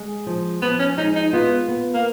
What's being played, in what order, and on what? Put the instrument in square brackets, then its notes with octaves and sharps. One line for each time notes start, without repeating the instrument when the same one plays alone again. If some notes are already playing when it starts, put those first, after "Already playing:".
Already playing: [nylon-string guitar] G#3
F3
[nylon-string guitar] F3 [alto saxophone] B3
[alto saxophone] C#4
[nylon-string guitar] G#3 [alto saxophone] D#4
[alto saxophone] D#4
[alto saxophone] B3 [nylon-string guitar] F4
[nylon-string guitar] B3
[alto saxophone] A#3